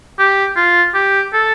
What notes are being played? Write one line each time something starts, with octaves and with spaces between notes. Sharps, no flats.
G4
F4
G4
A4